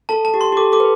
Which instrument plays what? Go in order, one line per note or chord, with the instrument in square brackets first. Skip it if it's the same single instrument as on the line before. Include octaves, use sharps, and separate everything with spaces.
[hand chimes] A4 [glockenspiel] A5
[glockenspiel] A5
[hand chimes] G4
[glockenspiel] C6
[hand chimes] G4
[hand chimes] A4 [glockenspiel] D6
[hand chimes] A4 [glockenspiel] D6
[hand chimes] B4